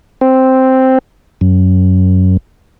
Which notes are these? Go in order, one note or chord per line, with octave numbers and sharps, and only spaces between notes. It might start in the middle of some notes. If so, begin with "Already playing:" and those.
C4
F#2